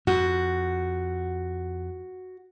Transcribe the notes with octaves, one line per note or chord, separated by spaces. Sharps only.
F2 F#4